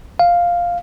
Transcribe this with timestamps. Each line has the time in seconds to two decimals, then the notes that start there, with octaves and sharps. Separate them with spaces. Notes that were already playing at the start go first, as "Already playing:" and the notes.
0.19 F5